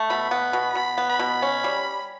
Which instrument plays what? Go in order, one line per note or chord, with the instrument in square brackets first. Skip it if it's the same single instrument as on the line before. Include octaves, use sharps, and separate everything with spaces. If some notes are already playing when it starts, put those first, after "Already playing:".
Already playing: [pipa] A3
[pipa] B2 [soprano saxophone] B5
[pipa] B3
B2
[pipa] B2 [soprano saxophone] B5
[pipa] B3
[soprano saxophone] B5
[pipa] B2
C#4
G3